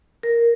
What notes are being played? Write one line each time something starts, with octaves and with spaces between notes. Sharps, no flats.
A#4